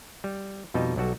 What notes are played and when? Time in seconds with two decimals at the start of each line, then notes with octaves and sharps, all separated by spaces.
0.24 G3
0.74 F2 B2 G3 D#4
0.96 B1 F#3 G3 F#4 A4